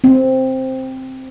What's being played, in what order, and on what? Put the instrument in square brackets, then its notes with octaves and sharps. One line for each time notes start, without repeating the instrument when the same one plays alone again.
[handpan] C4